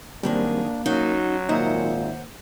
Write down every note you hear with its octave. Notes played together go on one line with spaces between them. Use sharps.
F#2 D#3 G3 A#3 C4 D4 G#4
F#3 C#4 D#4 F#4
G#1 D#2 A#2 D#4 C5 E5 F#5